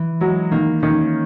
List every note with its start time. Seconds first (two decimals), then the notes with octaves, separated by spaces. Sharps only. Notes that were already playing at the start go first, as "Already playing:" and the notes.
Already playing: E3
0.21 F#3 G#3
0.51 D#3 A#3
0.82 D#3 C#4